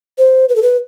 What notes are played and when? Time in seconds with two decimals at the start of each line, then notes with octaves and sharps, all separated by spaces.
0.18 C5
0.49 B4
0.56 A4
0.62 B4